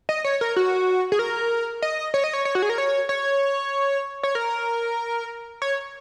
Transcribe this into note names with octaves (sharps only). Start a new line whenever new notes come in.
D#5
C#5
A#4
F#4
G#4
A#4
D#5
C#5
D#5
C#5
C#5
F#4
G#4
A#4
C#5
C#5
C#5
A#4
C#5